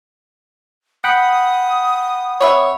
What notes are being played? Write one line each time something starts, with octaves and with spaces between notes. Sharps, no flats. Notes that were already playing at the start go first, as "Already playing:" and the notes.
F#5 G5 B5 D#6
C3 B4 C#5 E5